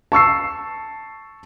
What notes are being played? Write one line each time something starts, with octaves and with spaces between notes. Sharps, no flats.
A5 C#6 E6 C7